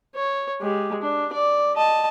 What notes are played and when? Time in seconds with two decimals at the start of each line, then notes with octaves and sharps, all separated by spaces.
0.15 C#5
0.61 G#3 G4
1.02 D4
1.33 D5
1.76 D#5 A5